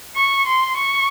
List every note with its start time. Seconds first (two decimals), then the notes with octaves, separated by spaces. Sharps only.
0.16 C#6
0.46 C6
0.77 C#6